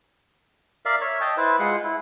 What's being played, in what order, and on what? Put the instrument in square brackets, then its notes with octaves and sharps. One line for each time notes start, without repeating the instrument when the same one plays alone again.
[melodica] A#4 D5 E5 F5
C#5 E5
D#5 G5 A5
E4 B4 C5
G#3 F4 F#5 C6
E4